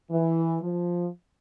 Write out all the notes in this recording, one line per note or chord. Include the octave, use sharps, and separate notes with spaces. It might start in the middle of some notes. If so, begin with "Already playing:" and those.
E3
F3